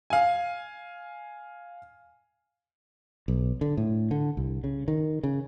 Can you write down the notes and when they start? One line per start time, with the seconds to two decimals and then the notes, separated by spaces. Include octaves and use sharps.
0.10 F5 G#5
3.28 B1
3.61 D3
3.77 A2
4.11 D3
4.37 C2
4.64 C#3
4.88 D#3
5.23 C#3